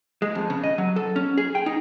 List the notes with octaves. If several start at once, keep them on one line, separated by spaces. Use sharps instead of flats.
G#3
F2
C#3
D#5
F#3
A4
C#4
G#4
G5
D#4